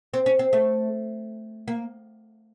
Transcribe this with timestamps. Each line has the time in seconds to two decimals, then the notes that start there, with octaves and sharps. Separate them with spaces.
0.14 C4
0.26 C#4
0.39 C4
0.53 A3
1.68 A#3